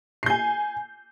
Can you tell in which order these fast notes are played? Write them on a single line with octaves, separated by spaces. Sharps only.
C7 G6 G#5